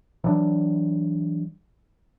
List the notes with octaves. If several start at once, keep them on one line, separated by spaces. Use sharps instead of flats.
E3 F#3 G3 D4